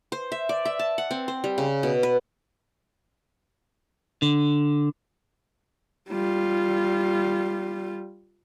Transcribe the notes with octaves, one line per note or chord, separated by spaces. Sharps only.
C5
E5
D5
E5
A5
F#5
C4
C5
G3
C#3
B2
B4
D3
G3 F4